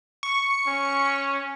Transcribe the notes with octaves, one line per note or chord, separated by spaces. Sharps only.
C#6
C#4